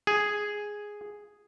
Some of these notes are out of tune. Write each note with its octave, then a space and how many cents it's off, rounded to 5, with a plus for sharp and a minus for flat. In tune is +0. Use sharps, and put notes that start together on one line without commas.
G#4 +0